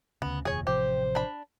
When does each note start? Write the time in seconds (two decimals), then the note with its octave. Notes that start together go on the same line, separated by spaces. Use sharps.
0.22 D2 C#3 B3
0.45 F1 D#2 A#2 G#4 C#5
0.67 A1 C3 F3 G4 C5
1.15 D4 B5